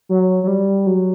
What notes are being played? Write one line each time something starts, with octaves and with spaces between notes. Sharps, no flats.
F#3
F#3
G3
F#3